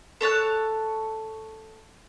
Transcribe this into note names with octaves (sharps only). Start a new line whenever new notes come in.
A4 C#5 A5 F#6